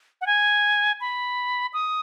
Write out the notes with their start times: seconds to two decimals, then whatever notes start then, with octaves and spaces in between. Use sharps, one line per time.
0.21 F#5
0.27 G#5
1.01 B5
1.73 D#6